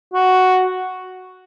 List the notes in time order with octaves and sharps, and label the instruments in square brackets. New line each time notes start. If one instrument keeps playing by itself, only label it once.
[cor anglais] F#4